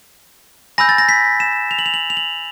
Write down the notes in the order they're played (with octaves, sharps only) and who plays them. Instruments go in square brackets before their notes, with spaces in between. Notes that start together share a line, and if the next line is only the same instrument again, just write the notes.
[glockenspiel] G#5 B5 E6 G6 A#6
A6
A#6
B6
E7
F7
F#7
F7
F#7
F7
F#7